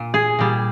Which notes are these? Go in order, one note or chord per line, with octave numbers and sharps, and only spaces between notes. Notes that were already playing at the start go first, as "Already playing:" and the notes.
Already playing: A#2
G#4
A#2 G3